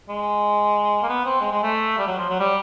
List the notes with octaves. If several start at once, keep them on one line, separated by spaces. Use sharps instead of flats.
G#3
A#3
B3
C4
G#3
G#3
A3
G3
F#3
F3
F#3
G3